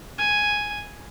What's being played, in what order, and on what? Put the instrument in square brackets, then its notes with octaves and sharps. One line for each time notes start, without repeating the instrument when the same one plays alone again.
[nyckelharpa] G#5